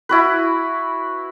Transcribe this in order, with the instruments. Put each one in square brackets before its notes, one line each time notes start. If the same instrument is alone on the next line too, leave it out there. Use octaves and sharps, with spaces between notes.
[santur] E4 F#4 B4